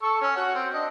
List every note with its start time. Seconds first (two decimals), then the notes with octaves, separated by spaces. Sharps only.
0.03 A4 C#6 E6
0.22 C#4
0.36 F#4 F#5
0.55 C4
0.74 D4 D#5